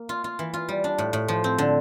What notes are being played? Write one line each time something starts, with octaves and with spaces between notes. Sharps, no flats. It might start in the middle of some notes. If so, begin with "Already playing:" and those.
Already playing: A#3
F4
F4
E3
F4
G3
D4
A2
A2
F3
C4
D3